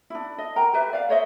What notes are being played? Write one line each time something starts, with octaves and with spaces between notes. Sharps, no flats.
D4 E4
D#5
E4 A#4 G5 A#5
G4 B4 E5
D5 F5
C5 C#5 D#5 E5